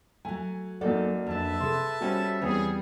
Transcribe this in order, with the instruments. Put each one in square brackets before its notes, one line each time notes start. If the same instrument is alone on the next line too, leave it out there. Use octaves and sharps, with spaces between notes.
[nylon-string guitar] F#3 A3 [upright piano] G#5
[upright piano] F#2 A#3 F#4 [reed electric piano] F#3 D5 [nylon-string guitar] D#4 A4
[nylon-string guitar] F2 D4 [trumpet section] B4 E5 A5
[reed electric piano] C3 C6 [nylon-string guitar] G#4 A4
[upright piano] G3 C#4 C5 [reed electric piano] F#4
[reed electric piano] E2 E3 C4 [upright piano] G3 B3 [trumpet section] G#4 [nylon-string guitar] C#5